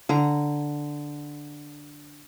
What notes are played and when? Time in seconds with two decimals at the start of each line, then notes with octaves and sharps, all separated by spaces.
0.09 D3 A#5